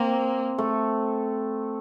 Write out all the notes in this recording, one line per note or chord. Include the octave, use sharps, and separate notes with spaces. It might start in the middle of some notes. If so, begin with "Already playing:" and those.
Already playing: A#3 C4
A3